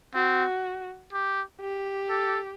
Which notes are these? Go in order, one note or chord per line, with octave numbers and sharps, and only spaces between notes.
C4 F#4
G4
G4
A4